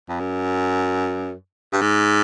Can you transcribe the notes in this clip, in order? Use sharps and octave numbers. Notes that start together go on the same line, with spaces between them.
F2
F#2
G2
G#2